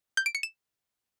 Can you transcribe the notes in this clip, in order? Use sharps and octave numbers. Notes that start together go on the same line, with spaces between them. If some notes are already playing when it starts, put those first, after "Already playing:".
G6
D7
C#7
E7